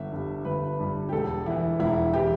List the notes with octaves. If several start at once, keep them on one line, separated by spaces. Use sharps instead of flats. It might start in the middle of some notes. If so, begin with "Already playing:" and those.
Already playing: G1 E5
G2 G3
G1 B4
G2 G3
G4
E1 A4
E2 E3 E4
E1 E4
E3 G4